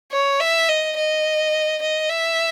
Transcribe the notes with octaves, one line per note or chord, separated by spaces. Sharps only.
C#5
E5
D#5
D#5
D#5
E5